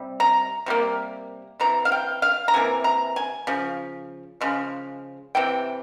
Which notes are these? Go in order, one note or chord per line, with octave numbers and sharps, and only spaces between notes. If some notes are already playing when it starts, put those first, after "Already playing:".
Already playing: C3 G3
A#5
C3 G3 A#3
C3 E3 A#5
F5
G5
F5
A#5
C3 E3 A#3 G#5
A#5
G#5
C#3 F3
C#3 F3 G#3
C3 E3 G5